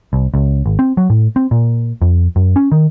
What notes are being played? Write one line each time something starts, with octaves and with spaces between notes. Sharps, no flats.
C2
C#2
G#1
C4
F#3
A2
C4
A#2
F2
F#2
C#4
D#3